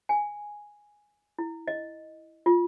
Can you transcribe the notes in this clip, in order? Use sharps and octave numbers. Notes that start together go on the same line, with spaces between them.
G#5
E4
D#5
F4